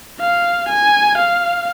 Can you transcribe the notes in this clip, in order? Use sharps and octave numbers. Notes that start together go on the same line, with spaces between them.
F5
G#5
F5